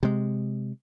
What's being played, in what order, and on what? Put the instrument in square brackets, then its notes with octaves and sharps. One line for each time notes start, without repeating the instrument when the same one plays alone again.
[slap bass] C3 G#3